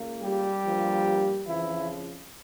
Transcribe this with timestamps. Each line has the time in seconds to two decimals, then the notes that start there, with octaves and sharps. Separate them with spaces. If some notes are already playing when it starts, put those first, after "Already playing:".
Already playing: C#2 C#3 A#3
0.22 G3 G4
0.63 G2 F3 A#3
1.46 F2 C#3 E3 F3 E4